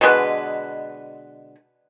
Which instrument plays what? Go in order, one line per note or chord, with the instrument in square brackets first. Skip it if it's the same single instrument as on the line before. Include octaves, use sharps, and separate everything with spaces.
[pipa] B2 D3 G#3 B4